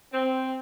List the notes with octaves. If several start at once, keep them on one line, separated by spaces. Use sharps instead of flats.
C4